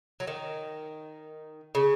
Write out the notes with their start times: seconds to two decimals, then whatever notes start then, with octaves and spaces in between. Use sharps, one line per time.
0.20 F#3
0.27 D#3
1.75 C#3